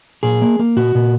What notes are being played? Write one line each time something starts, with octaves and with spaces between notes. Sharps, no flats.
A#2 G#4
A#3
A#3
A#2 F#4
A#2